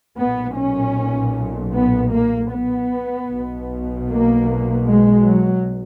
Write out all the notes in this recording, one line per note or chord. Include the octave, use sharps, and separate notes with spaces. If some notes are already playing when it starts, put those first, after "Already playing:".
B1 A#2 B3
C#4
B3
A#3
B3
B1 B2
A#3
G#3
F#3